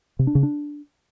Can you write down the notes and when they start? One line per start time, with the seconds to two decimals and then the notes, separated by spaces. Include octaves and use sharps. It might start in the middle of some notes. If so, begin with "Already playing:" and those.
0.19 C3
0.27 D4
0.35 C#3
0.43 D4